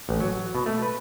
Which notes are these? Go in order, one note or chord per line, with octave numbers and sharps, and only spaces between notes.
A1
F#3
B2
A3
B4